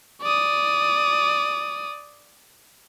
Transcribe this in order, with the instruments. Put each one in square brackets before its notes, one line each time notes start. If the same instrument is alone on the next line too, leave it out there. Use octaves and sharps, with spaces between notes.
[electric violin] D5 D#6